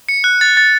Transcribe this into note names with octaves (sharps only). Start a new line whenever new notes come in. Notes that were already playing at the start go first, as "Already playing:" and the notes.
C#7
F#6
A6
A6